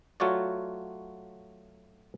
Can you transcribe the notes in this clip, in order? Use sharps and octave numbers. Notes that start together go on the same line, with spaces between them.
F#3 A3 F4 F#4 C#5 D5